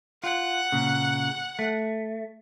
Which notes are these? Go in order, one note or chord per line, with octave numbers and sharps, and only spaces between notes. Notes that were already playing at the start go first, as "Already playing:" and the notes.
F4 F#5
A#2 C#3
A3